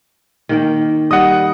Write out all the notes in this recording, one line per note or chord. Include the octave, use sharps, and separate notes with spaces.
D#3 A#3 G5
G3 D#5 F#5 D#6